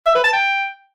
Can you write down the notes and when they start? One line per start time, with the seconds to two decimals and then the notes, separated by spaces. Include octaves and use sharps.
0.06 E5
0.15 B4
0.24 A5
0.33 G5